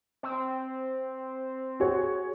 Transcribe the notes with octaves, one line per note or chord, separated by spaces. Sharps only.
C4
F#4 G#4 C#5